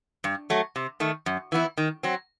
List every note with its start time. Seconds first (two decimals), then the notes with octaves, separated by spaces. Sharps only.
0.24 G2
0.50 F#3 A3
0.76 C3
1.00 D#3 A3
1.26 F#2
1.52 E3 B3 E4
1.77 D#3
2.03 F#3 C4